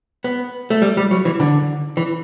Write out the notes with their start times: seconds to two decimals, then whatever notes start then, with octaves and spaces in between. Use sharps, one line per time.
0.24 B3
0.70 A3
0.82 G3
0.97 G3
1.11 F#3
1.25 E3
1.40 D3
1.97 E3